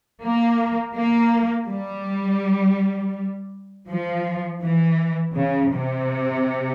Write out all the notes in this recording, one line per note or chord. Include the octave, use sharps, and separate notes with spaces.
A#3
A#3
G3
F3
E3
C#3
C3